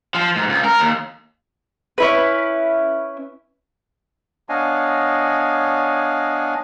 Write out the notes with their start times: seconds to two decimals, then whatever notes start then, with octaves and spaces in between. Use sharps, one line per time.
0.15 F3
0.36 G#2
0.49 C#2
0.64 A#4
0.80 D#2
1.98 C#4 E4 B4
4.49 B3 D4 C#5 D#5 F5 G#5